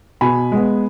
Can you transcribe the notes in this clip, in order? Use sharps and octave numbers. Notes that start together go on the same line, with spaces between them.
B2 G#5 B5
G#3 B3